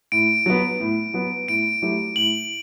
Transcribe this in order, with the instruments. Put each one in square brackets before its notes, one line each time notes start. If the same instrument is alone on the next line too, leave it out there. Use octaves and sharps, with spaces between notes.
[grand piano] A2 [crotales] D7
[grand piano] F#3 B3
A2
F#3 B3
[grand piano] A2 [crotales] D7
[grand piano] F#3 A3 E4 G4
[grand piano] A2 [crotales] F#7